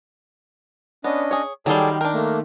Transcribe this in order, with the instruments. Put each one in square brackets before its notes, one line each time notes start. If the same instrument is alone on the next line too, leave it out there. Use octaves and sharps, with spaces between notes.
[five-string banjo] B3 [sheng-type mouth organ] C#4 D4 D#5
[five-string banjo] G#4 C#5
[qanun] D#3 C6 [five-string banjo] F#3 G3 [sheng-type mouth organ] G#4 A4 D5
[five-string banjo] D4 A#4 [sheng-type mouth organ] G5
[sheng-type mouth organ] A3 A#3